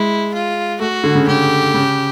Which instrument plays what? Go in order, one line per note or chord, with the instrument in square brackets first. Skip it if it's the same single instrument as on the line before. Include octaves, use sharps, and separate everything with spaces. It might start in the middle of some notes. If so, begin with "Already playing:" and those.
Already playing: [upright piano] G#3 [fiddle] E4
[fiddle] F4
[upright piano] A3 [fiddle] F#4
[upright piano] D3
C#3
[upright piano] C#3 [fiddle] G4
[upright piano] C#3